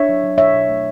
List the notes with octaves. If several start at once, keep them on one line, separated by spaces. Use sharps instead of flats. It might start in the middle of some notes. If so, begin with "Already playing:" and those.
Already playing: D4 C#5 E5
F#3
F#3
B2 C#5 E5
B2
A3